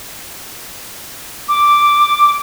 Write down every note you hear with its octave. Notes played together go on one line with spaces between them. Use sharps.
D6